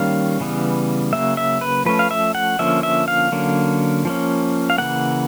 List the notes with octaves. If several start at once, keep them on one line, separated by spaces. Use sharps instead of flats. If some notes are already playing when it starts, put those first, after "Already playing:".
Already playing: D#3 G3 A#3 C#4 F5
C#3 E3 G3 B3
C#3 F#3 A#3 E5
E5
B4
F3 A3 C#4 B4
F5
E5
F#5
D3 F3 A#3 C#4 E5
E5
F5
D3 F#3 A#3 C#4
F3 A#3 C#4
F5
C#3 E3 G3 A#3 F#5